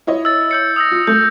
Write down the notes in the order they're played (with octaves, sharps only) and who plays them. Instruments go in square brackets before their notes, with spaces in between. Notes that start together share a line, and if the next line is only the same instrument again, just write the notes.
[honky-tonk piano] E4 C#5 D#5
[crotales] E6 A6
E6 G6 C#7
D#6 E6 A#6
[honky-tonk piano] F4
[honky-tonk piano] A3 [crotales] G6